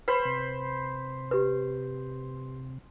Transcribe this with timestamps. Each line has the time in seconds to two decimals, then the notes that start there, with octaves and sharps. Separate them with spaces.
0.08 B4 C5 B5
0.25 C3
1.31 G4 B4